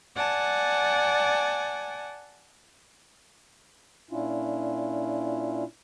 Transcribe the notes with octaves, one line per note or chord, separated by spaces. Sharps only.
D5 F#5 G#5 A5
A#2 C#4 D4 E4 F4